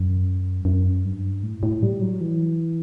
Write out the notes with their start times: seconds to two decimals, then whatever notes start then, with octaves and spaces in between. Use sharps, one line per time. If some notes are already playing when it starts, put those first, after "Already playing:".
Already playing: F#2
0.65 F#2
1.05 G2
1.43 A2
1.63 A2
1.83 G3
2.01 F#3
2.21 E3